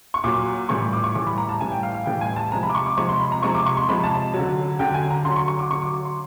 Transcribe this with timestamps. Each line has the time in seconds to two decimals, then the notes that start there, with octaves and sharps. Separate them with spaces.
0.14 C#6
0.24 A#2 F#3 D6
0.69 A2 E3 G3 C#6
0.93 D6
1.04 C#6
1.15 A2 E3 G3 D6
1.27 B5
1.38 A#5
1.49 A5
1.60 A2 E3 G3 G#5
1.72 G5
1.83 F5
1.94 F5
2.06 A2 E3 G3 G5
2.21 G#5
2.36 A5
2.52 C3 F3 G#3 A#5
2.63 B5
2.69 D6
2.75 C#6
2.86 D6
2.97 C3 F3 G#3 C#6
3.09 C6
3.20 B5
3.32 A#5
3.42 C3 F3 G#3 C#6
3.54 D6
3.66 C#6
3.77 C6
3.89 C3 F3 G#3 B5
4.04 A5
4.34 D3 F#3
4.79 D3 F#3 G5
4.94 G#5
5.10 A#5
5.25 D3 F#3 C6
5.36 C#6
5.48 C#6
5.59 D6
5.70 D3 F#3 C#6
5.82 D6
6.05 C6